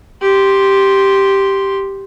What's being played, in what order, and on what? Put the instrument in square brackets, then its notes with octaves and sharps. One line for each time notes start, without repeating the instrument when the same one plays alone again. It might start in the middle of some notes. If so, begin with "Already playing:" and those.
[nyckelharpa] G4 C6